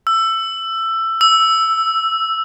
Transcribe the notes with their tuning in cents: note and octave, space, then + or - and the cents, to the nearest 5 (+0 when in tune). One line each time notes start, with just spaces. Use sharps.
E6 +15
E6 +0